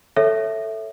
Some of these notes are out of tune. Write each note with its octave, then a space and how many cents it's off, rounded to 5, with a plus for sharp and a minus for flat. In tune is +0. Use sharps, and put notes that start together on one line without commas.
A4 +5 C#5 +0 E5 +0